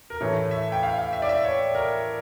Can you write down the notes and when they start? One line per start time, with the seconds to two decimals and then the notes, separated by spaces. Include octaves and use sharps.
0.10 A#4
0.21 A2 E3 A3 C#5
0.51 E5
0.72 G5
0.83 F5
0.98 F5
1.13 E5
1.22 D5
1.29 E5
1.45 C#5
1.75 A#4